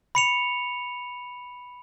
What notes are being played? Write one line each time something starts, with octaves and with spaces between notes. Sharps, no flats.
B5 C#7 F7